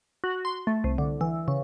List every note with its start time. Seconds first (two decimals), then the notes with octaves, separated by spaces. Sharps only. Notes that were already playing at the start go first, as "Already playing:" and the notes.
0.24 F#4
0.45 C6
0.67 A3
0.84 C2
0.98 D3
1.21 E3
1.48 C#3